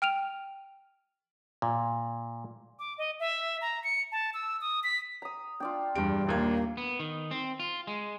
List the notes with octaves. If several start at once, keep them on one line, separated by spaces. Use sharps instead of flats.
G5 F6 D7 D#7 F7
A#2
D6
D#5
E5
A#5
C#7
A5
E6
D#6
B6
A#5 D#6
D4 F4 D5 G5
E2 G2 G3 D4 G4 D7
A#1 D#2 A#3 G#6
B3
D#3
C4
F4
G#3